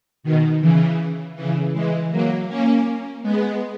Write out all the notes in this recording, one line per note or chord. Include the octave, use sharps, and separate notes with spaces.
B2 D#3
C#3 E3
C#3 E3
E3 G#3
F#3 A#3
A#3 C#4
G#3 B3